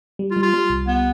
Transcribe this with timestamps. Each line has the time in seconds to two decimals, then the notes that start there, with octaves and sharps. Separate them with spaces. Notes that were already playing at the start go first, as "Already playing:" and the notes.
0.19 G3
0.31 F4
0.36 G3
0.43 F4
0.54 G3
0.70 C2
0.87 B3